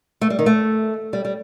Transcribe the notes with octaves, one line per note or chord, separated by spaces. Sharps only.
A3
G3
D#3
A3
G3
G3